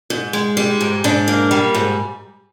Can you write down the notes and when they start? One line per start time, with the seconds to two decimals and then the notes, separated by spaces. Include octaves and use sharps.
0.10 G#2
0.33 G#3
0.57 G3
0.81 G#2
1.04 G#2 D4
1.28 A#3
1.51 G3
1.75 G#2